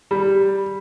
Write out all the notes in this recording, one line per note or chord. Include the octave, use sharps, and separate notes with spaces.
G3